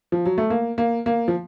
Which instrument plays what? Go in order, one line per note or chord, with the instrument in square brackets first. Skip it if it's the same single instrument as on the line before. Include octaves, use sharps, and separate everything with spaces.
[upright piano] F3
F#3
A3
A#3
A#3
A#3
F3